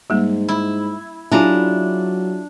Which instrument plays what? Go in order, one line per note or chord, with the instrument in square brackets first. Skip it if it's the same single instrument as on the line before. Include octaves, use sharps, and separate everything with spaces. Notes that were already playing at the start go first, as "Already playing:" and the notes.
[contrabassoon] G#2 [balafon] G3 A#3
[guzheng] E4
[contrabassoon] F#3 [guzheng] D4 A#5 [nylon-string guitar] E4 F4 G#4